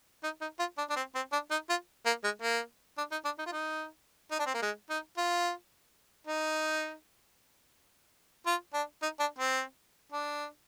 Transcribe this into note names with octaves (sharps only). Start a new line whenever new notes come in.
D#4
D#4
F4
D4
D4
C4
C4
D4
D#4
F4
A#3
G#3
A#3
D4
D#4
D4
D#4
F4
D#4
D#4
D4
C4
A#3
G#3
D#4
F4
D#4
F4
D4
D#4
D4
C4
D4